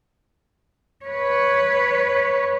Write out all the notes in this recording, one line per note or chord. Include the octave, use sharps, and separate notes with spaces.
B4 C#5